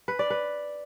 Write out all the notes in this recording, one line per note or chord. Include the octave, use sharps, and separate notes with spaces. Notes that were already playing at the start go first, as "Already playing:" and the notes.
B4
D5
B4